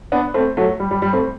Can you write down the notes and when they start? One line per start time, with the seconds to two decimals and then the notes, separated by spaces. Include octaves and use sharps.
0.12 B3 D4
0.34 A3 C4
0.57 F#3 A3
0.80 G3
0.91 G3
1.02 G3
1.13 A3 C4